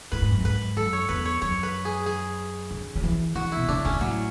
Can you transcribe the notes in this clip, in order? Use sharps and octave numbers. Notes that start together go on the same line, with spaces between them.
A2 B4
G#2
F#2
G#2 B4
F#2 A4
C#5
E2 B4
C#5
F#2 C#5
B4
G#4
G#4
D3
F#3
E3
E3 F#4
B2 E4
C#3 D4
C#3 C#4
B2
A2 F#3